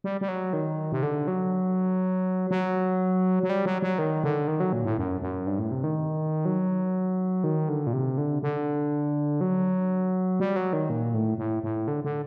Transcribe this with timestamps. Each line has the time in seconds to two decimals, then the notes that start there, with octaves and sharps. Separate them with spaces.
0.04 G3
0.21 G3
0.28 F#3
0.53 D#3
0.92 C3
1.03 D3
1.27 F#3
2.51 F#3
3.43 F#3
3.49 G3
3.66 F#3
3.82 F#3
3.98 D#3
4.23 D3
4.48 D#3
4.60 F#3
4.73 A#2
4.85 A2
4.97 F#2
5.21 F#2
5.47 G2
5.59 A2
5.71 C3
5.84 D#3
6.45 F#3
7.44 D#3
7.69 D3
7.87 A#2
7.93 C3
8.18 D3
8.43 D3
9.41 F#3
10.40 G3
10.56 F#3
10.73 D#3
10.90 A#2
11.14 A2
11.38 A2
11.63 A2
11.88 D3
12.04 D3